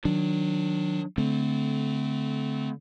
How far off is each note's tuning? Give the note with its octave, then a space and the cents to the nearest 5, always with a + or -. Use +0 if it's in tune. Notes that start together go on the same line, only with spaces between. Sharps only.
D#3 +0 F#3 -20 D4 +0
D3 -30 A3 -20 C4 -30